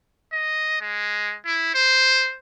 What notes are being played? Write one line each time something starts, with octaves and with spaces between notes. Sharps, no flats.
D#5
G#3
E4
C5